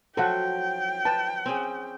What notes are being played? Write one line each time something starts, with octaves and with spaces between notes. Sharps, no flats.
F3 F#3 A4 F#5 G5 A5
B4 A5
C4 C#4 G#4